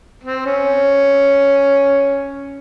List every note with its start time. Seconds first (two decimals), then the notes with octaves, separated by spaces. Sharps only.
0.23 C4
0.46 C#4